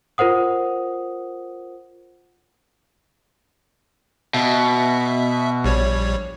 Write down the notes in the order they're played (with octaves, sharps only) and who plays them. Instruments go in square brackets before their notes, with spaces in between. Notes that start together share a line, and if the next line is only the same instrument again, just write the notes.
[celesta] F4 A#4 C5 F#5 D#6
[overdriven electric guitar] B2 [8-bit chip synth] E5
[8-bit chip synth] A#1 G3 C#5